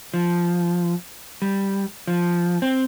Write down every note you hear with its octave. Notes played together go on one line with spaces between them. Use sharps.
F3
G3
F3
C4